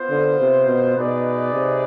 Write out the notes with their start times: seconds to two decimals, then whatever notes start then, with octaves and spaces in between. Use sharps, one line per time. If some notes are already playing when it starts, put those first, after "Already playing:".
Already playing: B3 F4 C5
0.10 D3
0.40 C3
0.67 B2
0.97 B2 D#4 G#4 B4 D5
1.53 C3